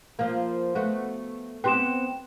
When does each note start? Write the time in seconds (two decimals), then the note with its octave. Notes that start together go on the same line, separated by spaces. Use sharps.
0.19 F3 A#3
0.75 A3 B3 F#4
1.64 B3 C4 G4 G5 C6 E7